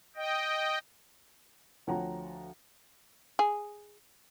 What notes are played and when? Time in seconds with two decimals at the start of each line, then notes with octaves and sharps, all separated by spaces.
0.16 D#5 G5
1.87 D2 F3 C#5 F#5 G5 A#5
3.39 G#4